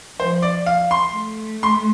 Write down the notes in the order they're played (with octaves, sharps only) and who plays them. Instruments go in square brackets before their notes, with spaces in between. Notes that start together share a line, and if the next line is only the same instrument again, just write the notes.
[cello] F3 [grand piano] C5
[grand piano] D5
F5
C6
[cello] A3
[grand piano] C6